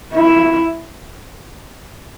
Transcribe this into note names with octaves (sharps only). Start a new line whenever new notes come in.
E4